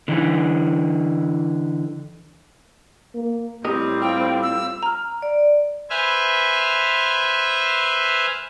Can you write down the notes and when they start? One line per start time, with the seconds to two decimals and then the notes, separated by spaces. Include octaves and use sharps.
0.08 D3 E3
3.15 A#3
3.65 A2 G3 C4 G4 A#4 D#5
4.02 F4 G5
4.43 E6
4.83 A#5 F6
5.22 D5
5.90 B4 C5 E5 G#5 F6